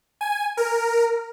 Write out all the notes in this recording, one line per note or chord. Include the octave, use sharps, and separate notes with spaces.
G#5
A#4